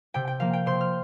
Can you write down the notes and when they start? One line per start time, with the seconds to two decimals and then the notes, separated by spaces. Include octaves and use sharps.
0.14 C3 G5
0.27 G5
0.40 F3 A#3 F5
0.53 G5
0.66 C3 C5 C6
0.81 F6